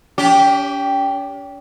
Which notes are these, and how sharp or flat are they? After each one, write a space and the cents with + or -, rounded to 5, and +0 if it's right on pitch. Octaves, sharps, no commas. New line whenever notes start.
C#4 +45 G4 +0